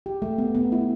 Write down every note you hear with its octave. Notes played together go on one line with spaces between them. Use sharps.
G4
A3
B3
B3
E4